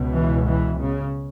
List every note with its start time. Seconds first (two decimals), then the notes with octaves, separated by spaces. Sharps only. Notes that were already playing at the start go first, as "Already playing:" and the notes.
Already playing: C#2 B2
0.14 E3
0.46 E3
0.79 C#3